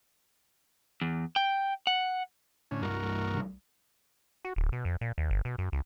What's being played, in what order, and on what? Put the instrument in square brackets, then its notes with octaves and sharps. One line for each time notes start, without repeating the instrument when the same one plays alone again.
[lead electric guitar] E2
G5
F#5
[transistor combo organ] A2 D3 C#4
[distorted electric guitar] C2 G2 [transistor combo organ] F#4 A#4
[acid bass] F#4
D1
B2
F2
A#2
D#2
G1
B2
F#2
C#2